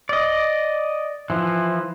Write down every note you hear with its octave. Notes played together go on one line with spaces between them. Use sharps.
D5 D#5
E3 F3